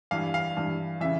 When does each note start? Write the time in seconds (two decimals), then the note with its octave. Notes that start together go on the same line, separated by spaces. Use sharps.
0.11 G2 E3 F5
0.34 F5
0.57 G2 E3
1.01 C#3 E3 E5